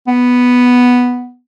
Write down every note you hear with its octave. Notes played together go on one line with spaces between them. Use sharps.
B3